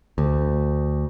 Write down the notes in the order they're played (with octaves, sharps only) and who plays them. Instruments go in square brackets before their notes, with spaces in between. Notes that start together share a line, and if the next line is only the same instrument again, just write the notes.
[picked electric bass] D2